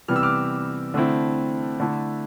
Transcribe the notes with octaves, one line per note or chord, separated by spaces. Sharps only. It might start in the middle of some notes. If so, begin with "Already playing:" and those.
C3 E3 G3 B3 F6
E6
D6 F6
D3 A3 C4 E4
D3 A3 E4